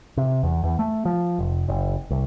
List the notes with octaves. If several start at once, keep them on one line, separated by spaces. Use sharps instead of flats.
C3
E2
E2
A3
F3
F1
F#1
C2